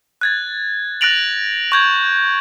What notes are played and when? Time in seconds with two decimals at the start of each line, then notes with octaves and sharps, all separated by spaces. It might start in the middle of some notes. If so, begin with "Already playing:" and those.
0.21 F#6 G#6 A6
1.01 F#6 A6 A#6 D7 F7 F#7
1.72 C#6 G6 G#6